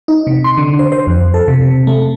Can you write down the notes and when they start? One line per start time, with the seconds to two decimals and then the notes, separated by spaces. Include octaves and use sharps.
0.08 D#4
0.27 C3
0.44 C6
0.58 D3
0.79 C5
0.92 C5
1.07 F2
1.34 A4
1.48 C3
1.62 C3
1.87 A3